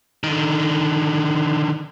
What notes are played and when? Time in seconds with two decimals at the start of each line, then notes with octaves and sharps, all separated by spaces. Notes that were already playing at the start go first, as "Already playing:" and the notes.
0.24 D3 D#3